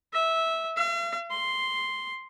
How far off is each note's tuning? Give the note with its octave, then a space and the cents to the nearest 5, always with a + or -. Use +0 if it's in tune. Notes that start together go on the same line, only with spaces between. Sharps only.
E5 -15
F5 -45
C6 +0